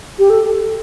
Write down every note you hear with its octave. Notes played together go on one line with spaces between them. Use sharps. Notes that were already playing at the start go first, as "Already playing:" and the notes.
G4
A4